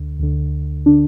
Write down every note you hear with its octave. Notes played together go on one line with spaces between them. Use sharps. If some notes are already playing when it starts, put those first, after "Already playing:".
Already playing: D2 D3
D2 D3
D3 D4